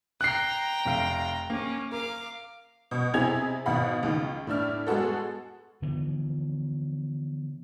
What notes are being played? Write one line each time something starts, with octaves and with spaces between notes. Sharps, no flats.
G5 A#5 F#6 C7
F1 F5 D7
A#3 C#4
A#4 F5 D6
B2
C3 E4 G#4 D#5 G#6 F7
G#1 B2 F5 F#5 B5
C#2 D#3
A2 D4 E4 F6
G#3 B3 F#4 A4
D3 E3 F3 B3